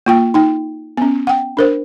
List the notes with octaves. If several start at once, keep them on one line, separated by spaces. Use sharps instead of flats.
A#3 F4 G5
D#4 G5
B3 C#4
F#5 G5
D4 A#4 C5